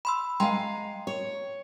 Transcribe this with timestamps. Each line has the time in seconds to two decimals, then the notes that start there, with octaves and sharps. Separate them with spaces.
0.05 B5 C6 E6
0.40 G#3 F5 G5 A#5 C6
1.07 C#5